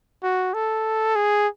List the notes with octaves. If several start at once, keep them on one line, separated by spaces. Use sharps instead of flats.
F#4
A4
G#4